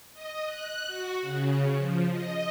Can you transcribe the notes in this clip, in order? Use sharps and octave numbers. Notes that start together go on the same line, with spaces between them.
D#5
F#6
F#4
C#3
F3
D#5